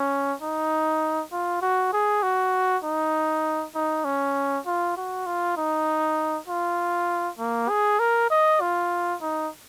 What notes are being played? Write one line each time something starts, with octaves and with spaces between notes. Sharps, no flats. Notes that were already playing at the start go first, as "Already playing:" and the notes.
Already playing: C#4
D#4
F4
F#4
G#4
F#4
D#4
D#4
C#4
F4
F#4
F4
D#4
F4
A#3
G#4
A#4
D#5
F4
D#4